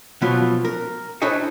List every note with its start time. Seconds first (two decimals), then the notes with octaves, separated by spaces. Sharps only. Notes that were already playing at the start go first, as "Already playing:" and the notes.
0.22 B2 F3 F#3 B3 F4
0.65 A#4
1.22 D4 E4 C5 C#5 D#5